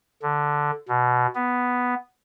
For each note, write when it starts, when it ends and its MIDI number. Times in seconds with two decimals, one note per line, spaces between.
0.22 0.71 50
0.89 1.27 47
1.35 1.94 59